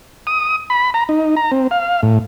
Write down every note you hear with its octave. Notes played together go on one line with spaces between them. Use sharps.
D#6
B5
A#5
D#4
A#5
C4
F5
A2